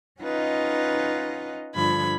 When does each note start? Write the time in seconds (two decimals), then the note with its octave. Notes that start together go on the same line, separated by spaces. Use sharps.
0.21 C#4 D#4 F4 B4 D#5 F#5
1.75 G2 D3 F3 B5 G#6